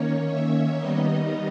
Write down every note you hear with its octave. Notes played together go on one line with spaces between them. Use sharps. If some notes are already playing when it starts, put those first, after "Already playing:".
Already playing: D#3 A#3 C#4 C#5
E5
D#3 G3 B3 D#4 D#5